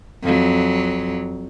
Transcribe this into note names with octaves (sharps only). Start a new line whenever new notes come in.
F2 F#3